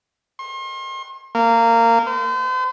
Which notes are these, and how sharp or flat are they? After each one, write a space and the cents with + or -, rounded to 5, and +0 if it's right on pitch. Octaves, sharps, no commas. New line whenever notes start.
C6 +40
A#3 -20
C5 -40